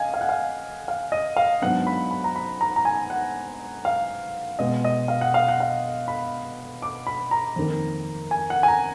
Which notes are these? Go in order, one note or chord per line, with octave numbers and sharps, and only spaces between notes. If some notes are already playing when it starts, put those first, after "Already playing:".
Already playing: D#5 F5 G#5
F5
F#5
F5
F5
D#5
F5
G#2 F#3 B3 D4 F#5
B5
B5
A#5
B5
A#5
A#5
G#5
F#5
F5
B2 G#3 B3 D#5
D#5
F5
F#5
F5
F#5
F5
B5
D6
B5
A#5
F2 D#3 A#3
G#5
F#5
G#5
A#5